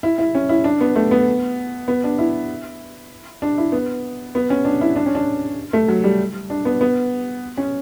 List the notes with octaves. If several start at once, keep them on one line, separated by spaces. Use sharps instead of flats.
E4
E4
C#4
E4
D4
B3
A3
B3
B3
D4
E4
D4
E4
B3
B3
C#4
D4
E4
D4
C#4
D4
A3
F#3
G3
D4
B3
B3
C#4